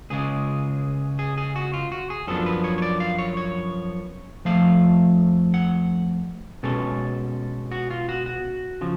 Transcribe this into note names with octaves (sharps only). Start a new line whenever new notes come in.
C#2 C#3 G#3 G#4
G#4
G#4
F#4
F4
F#4
G#4
F#2 F3 B3 D4 A4
B4
C#5
C#5
D5
F5
C#5
C#5
F2 F3 A3 F5
F#5
B2 G#3 C#4 A4
F#4
F4
F#4
F#4
C#3 F3